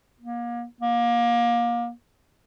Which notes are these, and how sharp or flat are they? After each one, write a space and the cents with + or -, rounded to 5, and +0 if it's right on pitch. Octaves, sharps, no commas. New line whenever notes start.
A#3 +35
A#3 +25